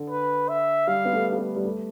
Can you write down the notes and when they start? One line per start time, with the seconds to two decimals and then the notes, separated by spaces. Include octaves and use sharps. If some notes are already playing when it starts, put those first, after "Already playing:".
Already playing: D3
0.10 B4
0.49 E5
0.87 G3 F5
1.05 B3
1.13 A3
1.32 A3
1.38 B3
1.56 G3
1.64 A3